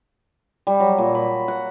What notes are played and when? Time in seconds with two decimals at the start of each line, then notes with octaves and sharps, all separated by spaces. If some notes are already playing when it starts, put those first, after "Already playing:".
0.67 G3
0.80 F#3
0.98 A#2
1.15 B5
1.48 F#5